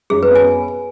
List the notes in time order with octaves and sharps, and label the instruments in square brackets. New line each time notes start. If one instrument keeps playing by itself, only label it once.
[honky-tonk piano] F#2 [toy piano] G#4
[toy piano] B4
[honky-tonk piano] B3
[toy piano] G#5